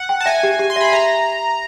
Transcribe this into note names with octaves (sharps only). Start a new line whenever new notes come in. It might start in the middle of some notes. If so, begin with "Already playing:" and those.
Already playing: F#5
G5
A5
E5 G#5
G4
G4
C6
E5 B5
E5 A#5